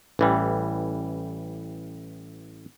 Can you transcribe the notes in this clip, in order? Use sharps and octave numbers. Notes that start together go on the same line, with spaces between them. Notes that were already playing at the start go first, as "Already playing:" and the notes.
A1 E3 G3